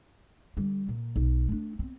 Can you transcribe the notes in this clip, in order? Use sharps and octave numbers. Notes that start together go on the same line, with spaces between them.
D3 G3
A#2
B1
A3 D4
B3 C4